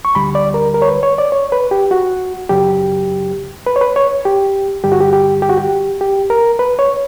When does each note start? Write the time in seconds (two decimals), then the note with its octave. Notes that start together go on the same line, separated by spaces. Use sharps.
0.05 C#6
0.15 D2 D3 G3 B5
0.35 D5
0.54 A#4
0.74 A#4
0.82 C#5
0.88 B4
1.03 C#5
1.18 D5
1.32 C#5
1.52 B4
1.71 G4
1.91 F#4
2.49 F#2 C#3 F#3 G4
3.67 B4
3.76 C#5
3.81 B4
3.96 C#5
4.25 G4
4.84 G2 D3 G3 G4
4.92 F#4
5.01 G4
5.13 G4
5.42 G4
5.50 F#4
5.57 G4
6.01 G4
6.30 A#4
6.59 B4
6.79 C#5